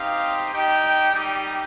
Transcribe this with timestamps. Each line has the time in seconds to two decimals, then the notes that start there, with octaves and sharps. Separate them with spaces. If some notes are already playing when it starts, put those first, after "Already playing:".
Already playing: C4 D#4 G4 F5
0.52 G3 D#4 G4 G5
1.13 G3 D#4 G4